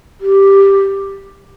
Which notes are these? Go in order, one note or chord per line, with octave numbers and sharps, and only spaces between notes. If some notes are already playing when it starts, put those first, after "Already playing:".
G4